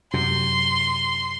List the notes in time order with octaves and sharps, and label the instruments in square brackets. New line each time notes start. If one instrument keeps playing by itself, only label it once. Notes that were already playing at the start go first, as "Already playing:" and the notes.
[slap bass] F#2 C3 [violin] C6